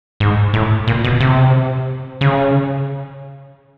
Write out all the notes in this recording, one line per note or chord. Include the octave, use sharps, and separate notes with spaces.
G#2
A2
A#2
B2
C3
C#3